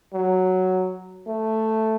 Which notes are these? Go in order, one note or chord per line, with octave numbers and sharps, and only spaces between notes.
F#3
A3